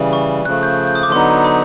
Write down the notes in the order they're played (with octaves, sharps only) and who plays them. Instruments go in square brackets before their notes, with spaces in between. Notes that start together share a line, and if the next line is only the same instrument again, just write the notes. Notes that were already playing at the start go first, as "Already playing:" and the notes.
Already playing: [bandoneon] C#3 E3 G3
[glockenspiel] C#6
[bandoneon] C#3 F3 A3 [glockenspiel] F#6
[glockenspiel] G6
G6
D#6
D6
[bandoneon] D3 F#3 B3 D#4 [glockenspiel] C6
[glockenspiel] B5